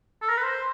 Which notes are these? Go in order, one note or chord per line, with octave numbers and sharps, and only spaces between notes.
A4
A#4
B4
C5